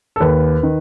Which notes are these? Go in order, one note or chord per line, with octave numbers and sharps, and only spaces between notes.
A4
D#2 B4
D#3